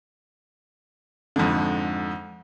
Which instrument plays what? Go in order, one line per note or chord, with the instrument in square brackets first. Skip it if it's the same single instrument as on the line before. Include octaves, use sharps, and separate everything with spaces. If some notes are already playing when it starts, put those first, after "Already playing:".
[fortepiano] F2 G#2 D3